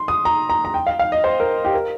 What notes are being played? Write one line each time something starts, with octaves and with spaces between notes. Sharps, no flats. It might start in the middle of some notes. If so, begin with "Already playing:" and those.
Already playing: C6
D#6
A#5
A#5
A#5
G5
F5
F5
D#5
C5
A#4
G4
A#4